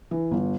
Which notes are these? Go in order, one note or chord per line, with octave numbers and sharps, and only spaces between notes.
E3
G1